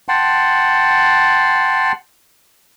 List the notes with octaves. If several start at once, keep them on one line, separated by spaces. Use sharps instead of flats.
F#5 G5 A5 C6